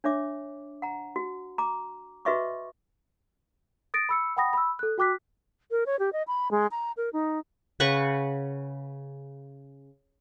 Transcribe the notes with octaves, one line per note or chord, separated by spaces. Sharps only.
D4 C#5 E5 D6
F#5 A#5
F#4
A#5 D6
F#4 B4 D#5 E5 C#6 D6
D#6 A6 A#6 D7
B5 E6 C#7
F#5 G5 B5 D#6 A#6
B5 E6
A4 F#6
F#4 G5 D6 F#6 B6
A#4
C#5
G4
D#5
B5
G#3
A#5
A#4
D#4
C#3 B4 F#5 C#6